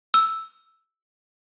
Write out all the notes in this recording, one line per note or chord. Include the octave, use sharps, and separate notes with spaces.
E6